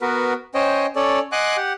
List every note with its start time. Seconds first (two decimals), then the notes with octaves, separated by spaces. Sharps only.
0.01 B3 F#4 A#4 B4
0.55 C#4 C5 C#5 D#5 G5
0.96 C#4 A4 C#5 D5
1.32 D#5 F#5 G#5 C6 D6 F#6
1.57 G4 F#5